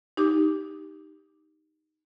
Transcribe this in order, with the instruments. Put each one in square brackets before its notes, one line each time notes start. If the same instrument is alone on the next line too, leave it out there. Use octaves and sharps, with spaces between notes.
[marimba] D#4 G4 D6